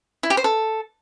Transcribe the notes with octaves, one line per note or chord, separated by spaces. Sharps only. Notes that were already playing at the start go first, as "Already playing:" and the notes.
E4
G4
C5
A4